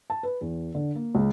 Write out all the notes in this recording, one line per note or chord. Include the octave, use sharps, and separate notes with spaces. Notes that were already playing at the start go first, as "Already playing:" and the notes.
A5
B4
E2
D3
A#3
C#2